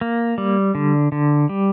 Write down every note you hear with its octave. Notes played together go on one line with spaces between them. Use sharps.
A#3
G3
D3
D3
G3